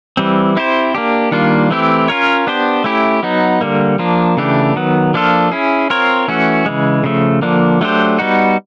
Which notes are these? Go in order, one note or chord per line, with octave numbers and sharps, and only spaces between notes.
E3 G3 C4
C4 E4 G4 C5
A#3 D4 G4
D#3 G3 A#3 D4 F4
E3 A3 C4 E4 G4
C#4 F4 A#4 C#5
B3 D4 G4 C5
A3 C#4 E4 G4
F#3 B3 D#4
D3 G3 A#3
F3 A#3 D4
C#3 E3 A3 D4 G4
D#3 F#3 B3
F3 A#3 D4 F4 A4
C#4 E4 G#4
C4 F4 A#4 C#5
E3 A3 C#4 F#4
C#3 E3 G#3
C#3 F3 A3
D3 F3 A#3 D4
F#3 A3 D4 G4 C5
G3 B3 D#4 F#4